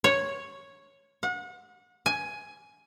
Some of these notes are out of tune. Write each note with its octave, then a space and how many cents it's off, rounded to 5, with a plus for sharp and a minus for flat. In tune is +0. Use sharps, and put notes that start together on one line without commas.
C#5 -5
F#5 -35
G#5 +10